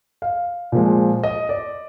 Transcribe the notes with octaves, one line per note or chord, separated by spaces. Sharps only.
F5
A#2 F3 G#3
D#5
D5